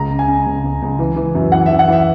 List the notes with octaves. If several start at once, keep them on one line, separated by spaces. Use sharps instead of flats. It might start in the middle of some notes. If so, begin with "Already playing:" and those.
Already playing: C#2 A#5
C#3
G#5
C#3
C#2
C#2
C#2
E3
E3
F#2
E3 F#5
E3 E5
F#5
E3 E5